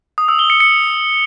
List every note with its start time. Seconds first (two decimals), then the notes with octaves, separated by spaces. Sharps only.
0.18 D#6
0.28 E6
0.39 G7
0.50 C#7
0.60 C#7